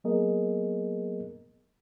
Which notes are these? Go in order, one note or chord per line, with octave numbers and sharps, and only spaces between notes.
F#3 A#3 B3 G#4 A#4 D#5